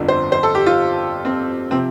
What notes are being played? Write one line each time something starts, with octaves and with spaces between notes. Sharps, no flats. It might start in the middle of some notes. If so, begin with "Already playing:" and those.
Already playing: G1 F2 D3 F3
C5
C5
A4
G4
F4
C4
C3 F3 C4